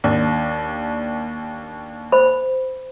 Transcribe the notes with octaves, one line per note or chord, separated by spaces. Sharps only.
D#2 D4
C5 B5